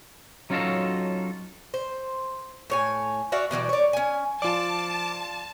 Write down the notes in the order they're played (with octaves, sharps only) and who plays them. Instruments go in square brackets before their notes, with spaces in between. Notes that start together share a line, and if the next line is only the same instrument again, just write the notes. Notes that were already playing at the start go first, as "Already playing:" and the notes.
[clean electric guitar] F#3 C#4 D#4 F4 F#4 A4
[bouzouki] C5
A2 C#5 G#5
F#4 D5 E5 F5
B2 E3 F#3 G3
C#5 D5
C#4 G#5
[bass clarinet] F3 [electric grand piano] F4 D5 [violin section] A5 [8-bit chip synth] D6